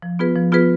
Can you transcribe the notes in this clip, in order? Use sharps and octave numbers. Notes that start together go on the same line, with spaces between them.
F3
B3 F4 G#4 B4
F3
B3 F4 G#4 B4